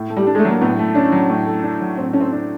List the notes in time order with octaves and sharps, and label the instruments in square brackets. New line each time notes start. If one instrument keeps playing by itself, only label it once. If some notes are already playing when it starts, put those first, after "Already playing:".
Already playing: [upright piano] A2
A3
[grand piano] G3
[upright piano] D4
[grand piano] G#3
A3
[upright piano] F#3
[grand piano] A#3
[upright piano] A2 [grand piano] B3
[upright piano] A3
[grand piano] C#4 [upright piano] D4
[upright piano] F#3
A2
A3
D4
F#3
[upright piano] A2 [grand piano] C4
[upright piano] A3 [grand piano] C#4
[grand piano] C4
[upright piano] D4